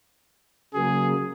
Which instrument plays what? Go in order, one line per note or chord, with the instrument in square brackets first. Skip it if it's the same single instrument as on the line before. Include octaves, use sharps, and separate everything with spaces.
[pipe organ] C#3 F#3 A#3 [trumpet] G#4